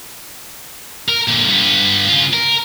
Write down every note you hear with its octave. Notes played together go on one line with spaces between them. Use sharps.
A#4
A#2 D3
G2 B3
C#3 F4
A#4